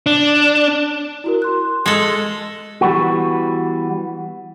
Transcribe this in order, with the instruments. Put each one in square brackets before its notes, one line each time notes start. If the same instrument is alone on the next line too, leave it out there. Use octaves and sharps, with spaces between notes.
[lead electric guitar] D4
[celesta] E4 F#4 A#4
C6 F#6
[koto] G#3 A4
[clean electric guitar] E3 G3 B3 F#4